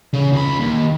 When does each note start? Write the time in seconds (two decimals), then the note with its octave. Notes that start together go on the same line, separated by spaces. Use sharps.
0.13 C#3
0.33 C#2 B5
0.60 D#2